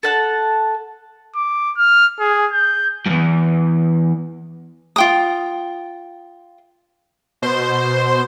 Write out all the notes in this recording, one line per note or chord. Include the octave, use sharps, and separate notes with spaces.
A4 F#5 A5
D6
F6
G#4
G6
E2 G2
F4 G5 D#6
B2 C5 C6